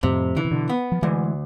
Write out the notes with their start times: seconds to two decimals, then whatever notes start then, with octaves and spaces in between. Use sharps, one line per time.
0.03 F2 A2 C3
0.36 D3 E3
0.45 C3
0.51 B2 D3
0.69 B3
0.92 F3
1.02 D2 E3 G#3